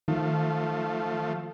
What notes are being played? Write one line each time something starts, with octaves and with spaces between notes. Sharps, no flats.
D#3 F3 A3